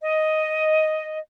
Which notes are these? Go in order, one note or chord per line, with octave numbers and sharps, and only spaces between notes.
D#5